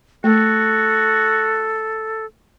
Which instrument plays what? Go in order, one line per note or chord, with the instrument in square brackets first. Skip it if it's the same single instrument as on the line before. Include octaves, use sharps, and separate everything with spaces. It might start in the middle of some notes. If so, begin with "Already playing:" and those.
[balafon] A3 [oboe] F#4 [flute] A4